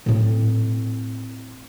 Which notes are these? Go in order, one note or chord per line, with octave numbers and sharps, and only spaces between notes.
A2 C4